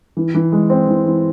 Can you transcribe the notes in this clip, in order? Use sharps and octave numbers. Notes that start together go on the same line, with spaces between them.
E3
E3
G#3
C4
E3
E3